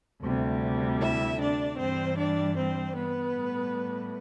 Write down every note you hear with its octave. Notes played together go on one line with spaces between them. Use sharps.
D2 C3 G3
E4 E5
D4 D5
G2 E3 G3 C4 C5
D4 D5
C4 C5
B3 B4
A2 G3